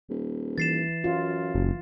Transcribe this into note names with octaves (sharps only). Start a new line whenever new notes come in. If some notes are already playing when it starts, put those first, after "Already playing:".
D#1
E3 A6 C7 E7
F#2 F4
F#1